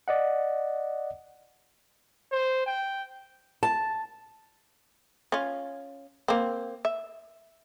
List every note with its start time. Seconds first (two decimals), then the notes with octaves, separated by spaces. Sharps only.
0.08 D5 D#5 F#5
2.32 C5
2.66 G5
3.63 A5
5.32 C#4 F4
6.28 A#3 C4
6.85 E5